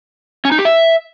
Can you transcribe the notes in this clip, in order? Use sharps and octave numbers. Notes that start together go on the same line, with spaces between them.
C#4
D#4
G4
E5